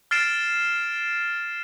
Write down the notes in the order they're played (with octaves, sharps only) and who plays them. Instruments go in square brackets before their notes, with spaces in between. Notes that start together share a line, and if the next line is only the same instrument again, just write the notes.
[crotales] F6 A6 C7 D7 E7